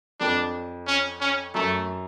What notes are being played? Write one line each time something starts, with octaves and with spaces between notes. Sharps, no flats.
F2 D4
C#4
C#4
F#2 A3